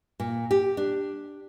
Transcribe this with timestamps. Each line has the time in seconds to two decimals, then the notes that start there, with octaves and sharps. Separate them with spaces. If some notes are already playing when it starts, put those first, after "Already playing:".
0.20 A#2
0.51 G4
0.77 D4